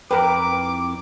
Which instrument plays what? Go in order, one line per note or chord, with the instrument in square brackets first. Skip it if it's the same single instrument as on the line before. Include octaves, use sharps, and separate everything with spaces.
[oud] F2 E3 [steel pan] A#4 B4 [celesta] G5 A#5 [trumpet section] D6